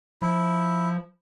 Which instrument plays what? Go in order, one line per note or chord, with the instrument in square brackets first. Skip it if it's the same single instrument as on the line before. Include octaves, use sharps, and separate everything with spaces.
[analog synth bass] F3 [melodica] E4